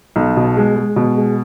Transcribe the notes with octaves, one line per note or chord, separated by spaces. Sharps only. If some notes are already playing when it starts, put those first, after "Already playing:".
B1
B2
G#3
G#3
B2
G#3